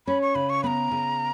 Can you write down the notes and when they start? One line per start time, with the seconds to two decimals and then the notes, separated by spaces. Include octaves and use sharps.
0.07 C#4 B5
0.21 C#6
0.35 C#3 B5
0.50 C#6
0.63 B3 A#5 B5
0.91 C#3